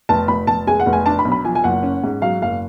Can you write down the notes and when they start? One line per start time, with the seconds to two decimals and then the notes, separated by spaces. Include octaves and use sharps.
0.09 F1 A5
0.28 F1 B5
0.47 F1 A5
0.67 G#3 G#5
0.80 F#5
0.86 F1
0.93 G#5
1.06 D4 A5
1.19 B5
1.25 B1
1.32 B5
1.45 F3 G#5
1.55 G#5
1.64 F#1 F#5
1.83 C#4
2.04 G#2
2.22 F#3 F5
2.42 F#1 F5